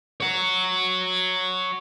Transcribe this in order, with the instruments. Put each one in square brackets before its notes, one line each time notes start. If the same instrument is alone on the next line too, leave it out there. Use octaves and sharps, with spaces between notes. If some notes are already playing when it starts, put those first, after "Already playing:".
[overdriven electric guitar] C#5 F#5